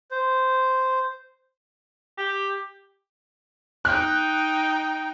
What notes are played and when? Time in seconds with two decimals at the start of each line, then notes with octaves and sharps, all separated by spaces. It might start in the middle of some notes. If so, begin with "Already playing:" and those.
0.11 C5
2.18 G4
3.85 D#4 G5 F#6